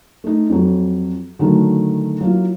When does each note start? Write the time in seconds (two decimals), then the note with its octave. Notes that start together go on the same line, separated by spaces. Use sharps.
0.24 A3 D#4
0.50 F2 F#3
1.39 D3 D#3 F#3 A3
2.21 F#3 A#3 E4 F4